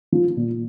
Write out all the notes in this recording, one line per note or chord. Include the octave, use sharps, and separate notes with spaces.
F3
A#2